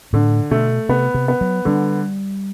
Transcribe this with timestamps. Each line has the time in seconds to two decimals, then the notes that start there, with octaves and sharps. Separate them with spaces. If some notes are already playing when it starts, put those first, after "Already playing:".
0.13 A2 D3
0.51 B2 A3
0.89 C3 B3
1.14 C3
1.28 B3
1.41 F#3
1.65 D3 G3